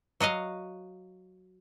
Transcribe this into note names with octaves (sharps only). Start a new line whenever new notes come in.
F#3 F#4 D#5 F5